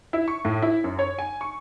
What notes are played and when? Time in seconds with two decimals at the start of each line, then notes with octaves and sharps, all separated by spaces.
0.13 E4
0.28 C#6
0.45 A2
0.62 E4
0.84 F#2
0.99 C#5
1.18 G#5
1.41 C#6